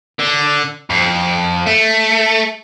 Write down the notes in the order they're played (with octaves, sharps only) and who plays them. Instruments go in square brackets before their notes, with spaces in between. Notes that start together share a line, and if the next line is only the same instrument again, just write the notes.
[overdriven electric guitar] D3
F2
A3